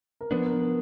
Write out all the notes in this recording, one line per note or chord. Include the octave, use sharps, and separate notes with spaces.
A#4
F3 B3 D4 B4
A#4
A#4